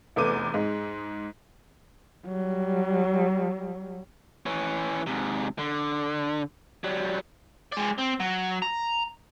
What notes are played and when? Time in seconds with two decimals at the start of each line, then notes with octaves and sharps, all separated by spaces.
0.16 F1 E2 A3 B3 D6 D#7
0.54 G#2 G#3
2.27 F#3 G3
4.46 E3 C#4
5.07 G#2 C3
5.58 D3
6.84 F#3 G3
7.72 G#3 D5
7.98 C4
8.20 F#3
8.62 A#5